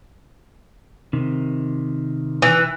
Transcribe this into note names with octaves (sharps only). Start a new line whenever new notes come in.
C3 D#3
E3